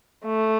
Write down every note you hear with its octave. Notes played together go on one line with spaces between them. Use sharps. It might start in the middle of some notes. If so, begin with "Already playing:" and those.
A3